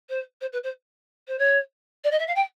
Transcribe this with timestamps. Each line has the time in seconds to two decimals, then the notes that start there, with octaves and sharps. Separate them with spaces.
0.09 C5
0.41 C5
0.53 B4
0.63 C5
1.28 C5
1.39 C#5
2.04 D5
2.11 D#5
2.19 E5
2.27 F5
2.36 G5